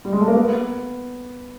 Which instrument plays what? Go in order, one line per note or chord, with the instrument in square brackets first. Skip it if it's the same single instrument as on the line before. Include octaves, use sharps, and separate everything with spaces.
[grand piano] G3
G#3
A3
A#3
B3